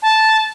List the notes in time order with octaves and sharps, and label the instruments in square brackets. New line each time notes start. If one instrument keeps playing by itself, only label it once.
[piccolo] A5